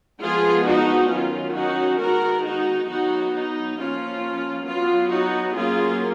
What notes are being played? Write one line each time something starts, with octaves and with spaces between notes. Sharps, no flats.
F3 G#3 B3 F4 G#4
D#4 F#4
D#3 F#3 C#4 F4
D#4 F#4
D#3 G#3 B3 F#4 A#4
D#4 F#4
F#3 B3 D#4 F#4
D#4
F3 A#3 C#4 F4
F#3 B3 F4
D#4 F#4
F#3 A#3 C#4 F4 G#4